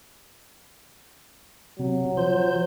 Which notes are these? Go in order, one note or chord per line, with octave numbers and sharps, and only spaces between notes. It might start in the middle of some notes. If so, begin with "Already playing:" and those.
C3 F#3
F3 C5 G6